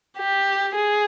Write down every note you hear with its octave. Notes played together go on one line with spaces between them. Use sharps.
G4
G#4